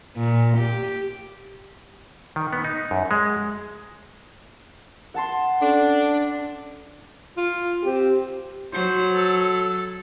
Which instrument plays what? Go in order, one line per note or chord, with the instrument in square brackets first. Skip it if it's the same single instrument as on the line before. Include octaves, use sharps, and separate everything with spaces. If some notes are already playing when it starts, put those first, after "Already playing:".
[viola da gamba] A#2
G4
[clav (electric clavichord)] D#3
B3
D#4
F#2
G#3
[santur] F#5 A5 C6
[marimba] C#4 A4 [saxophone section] D4
[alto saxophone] F4
[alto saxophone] C4 [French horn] G4
[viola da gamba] F#3 [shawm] C5
[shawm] A4